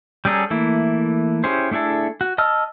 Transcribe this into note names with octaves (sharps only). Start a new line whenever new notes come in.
G3 C#4 G#4 A4 A#5
E3 A3 A#3 E4
C#4 E4 G4 G#4 C5
A3 D4 E4 G#4 A4
F#4
D#5 A5 E6 F6